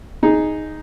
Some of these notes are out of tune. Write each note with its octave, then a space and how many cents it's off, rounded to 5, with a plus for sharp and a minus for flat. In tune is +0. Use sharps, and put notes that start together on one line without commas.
D#4 +0 G#4 +0